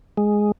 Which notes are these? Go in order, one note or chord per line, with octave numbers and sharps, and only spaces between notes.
G#3